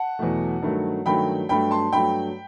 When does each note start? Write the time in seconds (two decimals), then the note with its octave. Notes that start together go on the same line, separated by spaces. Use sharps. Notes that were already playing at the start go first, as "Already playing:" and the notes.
Already playing: F#5 A5
0.19 E2 B2 F#3 A3
0.62 G2 D#3 F#3 A3
1.06 G2 D#3 F#3 A3 G5 B5
1.49 G2 F#3 A3 G5 B5
1.71 A5 C6
1.93 G2 F#3 A3 G5 B5